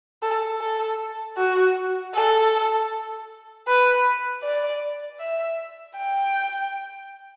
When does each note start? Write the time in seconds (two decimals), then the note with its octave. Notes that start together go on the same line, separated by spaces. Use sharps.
0.22 A4
0.60 A4
1.37 F#4
2.14 A4
3.67 B4
4.43 D5
5.20 E5
5.97 G5